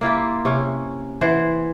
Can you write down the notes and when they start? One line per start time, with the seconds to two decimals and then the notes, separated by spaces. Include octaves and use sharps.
0.01 A#3 E4 F4 G4
0.45 C3 C#4
1.21 E3 C5 F#5